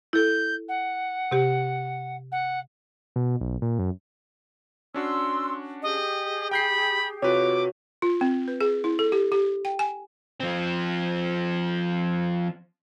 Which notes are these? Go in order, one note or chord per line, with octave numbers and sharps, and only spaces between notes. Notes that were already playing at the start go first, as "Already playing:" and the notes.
E4 A4 G6
F#5
C3 G4
F#5
B2
B1
A#2
F#2
C#4 D4 F#4 C6 E6
G4 G#4 D#5
G5 B5 G6 C7
C3 F4 F#4 B4 C#5 D6
F4
C4
B4
G#4
E4
A4
G4
G4
G5
G#5
F3 C4